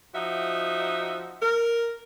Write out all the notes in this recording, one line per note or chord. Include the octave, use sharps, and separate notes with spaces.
F3 D#4 F#4 E5
A#4